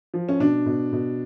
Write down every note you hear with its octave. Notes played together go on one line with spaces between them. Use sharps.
F3
C#4
B2 D4
B2
B2